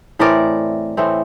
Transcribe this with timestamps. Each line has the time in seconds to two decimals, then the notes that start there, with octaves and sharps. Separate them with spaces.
0.19 A2 E3 A3 C4 A#4 D5
0.97 A2 E3 A3 C4